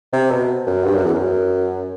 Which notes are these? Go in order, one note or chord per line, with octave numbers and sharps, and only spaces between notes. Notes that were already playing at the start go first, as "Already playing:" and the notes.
C3
B2
F#2
G2
F#2
E2
F#2